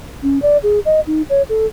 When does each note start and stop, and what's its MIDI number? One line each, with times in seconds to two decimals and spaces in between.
0.23 0.41 61
0.42 0.57 74
0.63 0.80 68
0.85 1.00 75
1.07 1.22 63
1.30 1.42 73
1.49 1.66 69